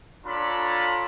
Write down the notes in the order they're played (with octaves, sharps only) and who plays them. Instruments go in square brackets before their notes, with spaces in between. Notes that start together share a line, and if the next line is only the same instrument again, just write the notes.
[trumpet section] D4 F4 A4 C#5 A#5 B5